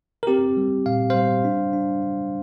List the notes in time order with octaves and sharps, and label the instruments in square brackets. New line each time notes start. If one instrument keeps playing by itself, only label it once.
[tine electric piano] A#4
C4 G4
G3
A#2 F5
G3 C5 F5
D4
D4
D4